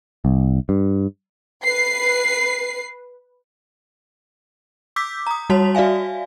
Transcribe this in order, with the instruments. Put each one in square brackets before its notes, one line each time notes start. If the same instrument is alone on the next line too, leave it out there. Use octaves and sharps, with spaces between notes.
[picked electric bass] C2
G2
[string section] B4 C7
[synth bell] D6 E6 G6 B6
A#5 D#6
G3 F#4 C#5 A5 B6 F7
F#4 D5 E5 F5 G#5